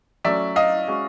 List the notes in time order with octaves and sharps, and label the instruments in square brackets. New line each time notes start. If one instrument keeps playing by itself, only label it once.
[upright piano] F#3 A3 C#4 [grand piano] D5 E5
[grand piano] D#5 F5
[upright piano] G#3 C#4 F#4